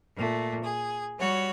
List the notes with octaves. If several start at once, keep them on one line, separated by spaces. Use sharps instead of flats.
A#2 A3
G#4
G3 F#4 C#5